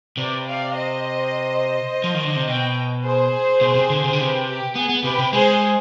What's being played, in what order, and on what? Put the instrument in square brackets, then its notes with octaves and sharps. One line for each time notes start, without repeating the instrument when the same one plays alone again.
[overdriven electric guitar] C3 [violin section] B4 D5
[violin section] D5 F5
C5 D#5
[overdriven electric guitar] F3
D#3
D3
C3
[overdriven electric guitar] B2 [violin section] D#5 G5
[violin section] G#4 C5
[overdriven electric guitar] B2
C3
D3
C3
D3
[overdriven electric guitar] C3 [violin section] G4 B4
[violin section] G4
[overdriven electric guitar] B3 [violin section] G#4
[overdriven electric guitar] B3
[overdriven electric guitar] C3 [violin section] G4 B4
[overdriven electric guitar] C3
[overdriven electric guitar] G#3 [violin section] G#4 C5